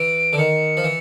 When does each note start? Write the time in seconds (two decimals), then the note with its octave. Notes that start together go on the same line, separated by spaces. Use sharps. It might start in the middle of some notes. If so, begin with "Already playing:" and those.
Already playing: E3 D7
0.33 D3
0.38 D#3 C#7
0.77 F3
0.84 E3